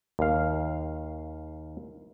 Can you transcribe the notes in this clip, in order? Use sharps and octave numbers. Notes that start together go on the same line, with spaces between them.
D#2 F5